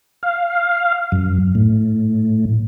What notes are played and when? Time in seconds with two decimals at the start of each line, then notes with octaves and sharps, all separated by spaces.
0.23 F5
1.12 F#2
1.55 A2